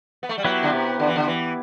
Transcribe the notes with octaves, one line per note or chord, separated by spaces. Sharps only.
B3
A3
G3
F#3 B3 E4 G4 B4
D3
C3
D3
E3
D3
E3